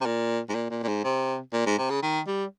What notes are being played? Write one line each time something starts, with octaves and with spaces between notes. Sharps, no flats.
C3
A#2
G#2
A#2
A#2
A#2
G#2
C3
A#2
G#2
C3
C#3
D#3
G3